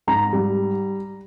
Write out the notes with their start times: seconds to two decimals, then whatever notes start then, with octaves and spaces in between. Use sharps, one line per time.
0.08 G#2 A#5
0.33 G3